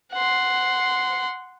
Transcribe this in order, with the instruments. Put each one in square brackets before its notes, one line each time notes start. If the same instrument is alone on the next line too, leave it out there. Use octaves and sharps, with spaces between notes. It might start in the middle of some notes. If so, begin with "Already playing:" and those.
[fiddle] F#5 C6